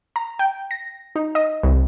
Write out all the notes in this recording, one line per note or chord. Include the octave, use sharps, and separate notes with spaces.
A#5
G5
A#6
D#4
D#5
C2